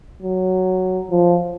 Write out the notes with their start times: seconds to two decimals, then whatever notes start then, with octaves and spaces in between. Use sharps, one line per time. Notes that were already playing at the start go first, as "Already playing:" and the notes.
0.23 F#3
1.11 F3